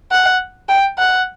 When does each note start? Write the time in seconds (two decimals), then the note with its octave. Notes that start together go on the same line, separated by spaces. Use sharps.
0.12 F#5
0.69 G5
0.98 F#5